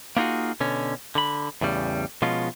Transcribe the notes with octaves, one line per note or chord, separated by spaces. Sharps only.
A#3 B3 D#4 F4 F#4 G#4
B2 D3 C#4
D3 B5
E2 A2 C#3 G3
B2 F3 G#3 C#4 F4